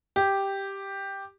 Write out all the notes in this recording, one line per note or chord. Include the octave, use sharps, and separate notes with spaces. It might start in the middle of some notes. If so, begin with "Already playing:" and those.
G4